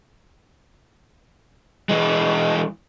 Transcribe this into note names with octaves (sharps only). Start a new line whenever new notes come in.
E3 G#3